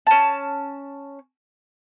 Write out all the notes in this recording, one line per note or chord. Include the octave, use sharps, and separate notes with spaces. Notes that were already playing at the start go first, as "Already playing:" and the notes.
C#4 A5